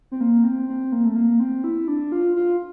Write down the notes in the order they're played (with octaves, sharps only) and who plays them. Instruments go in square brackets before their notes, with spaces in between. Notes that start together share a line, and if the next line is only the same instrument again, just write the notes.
[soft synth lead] C4
A#3
C4
C4
A#3
A3
A#3
C4
E4
D4
F4
F4